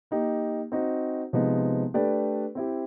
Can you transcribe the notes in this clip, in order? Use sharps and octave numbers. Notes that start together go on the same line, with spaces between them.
A#3 D#4 G4
C4 D#4 F#4
C3 F3 G#3 B3 D#4
A3 D4 G4 B4 D5
C4 E4 G4